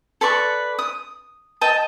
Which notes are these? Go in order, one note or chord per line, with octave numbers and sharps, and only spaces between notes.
A4 B4 D5 C#6
D#6
D#5 G5 A5